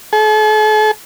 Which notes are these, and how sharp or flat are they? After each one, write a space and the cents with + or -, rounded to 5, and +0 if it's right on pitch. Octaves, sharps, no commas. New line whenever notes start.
A4 -45